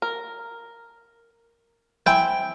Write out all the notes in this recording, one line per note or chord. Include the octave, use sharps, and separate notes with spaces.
A#4
C4 E4 G5 G#5